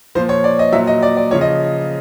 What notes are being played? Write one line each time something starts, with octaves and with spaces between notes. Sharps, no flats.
A#2 F3 C5
C#5
D5
D#5
A#2 F#3 E5
D#5
D5
D5
C#3 F3 C#5
D#5